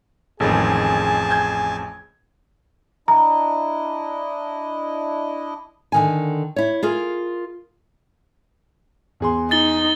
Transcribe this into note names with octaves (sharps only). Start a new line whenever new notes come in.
A1 F2 D#3 G#3 G#4 A4 G#5 A5
G6 G#6
D4 E4 D#5 A#5
D3 D#3 G#5
E4 C#5
F4 G#4 A#4
E2 G#4 C6
D#4 A6 G7